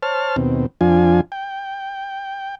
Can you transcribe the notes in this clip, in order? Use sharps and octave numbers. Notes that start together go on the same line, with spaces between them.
C5 C#5 A5 F6
D#2 B2 C4
F2 F3 D4 F4 G#5
G5